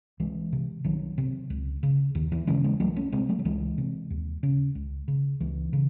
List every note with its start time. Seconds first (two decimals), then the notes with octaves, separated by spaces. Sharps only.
0.20 C2 E3 G#3
0.53 C3
0.84 C2 D#3 F#3
1.18 C3
1.50 C#2
1.83 C#3
2.15 D#2 D#3
2.32 E3
2.47 C#3 E3 G#3
2.64 E3 G#3
2.80 C2 F#3 A3
2.96 A3 C#4
3.12 C3 G#3 C4
3.29 F#3 A3
3.39 F#3
3.45 C#2 E3 G#3
3.78 C3
4.10 D#2
4.43 C#3
4.75 C#2
5.08 C#3
5.40 C#2 E3
5.73 C#3